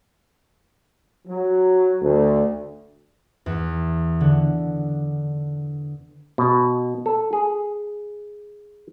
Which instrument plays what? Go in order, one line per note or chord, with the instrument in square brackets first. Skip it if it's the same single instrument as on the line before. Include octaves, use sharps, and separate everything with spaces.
[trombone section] F#3
D2
[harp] E2
D3
[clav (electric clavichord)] B2
A4
G#4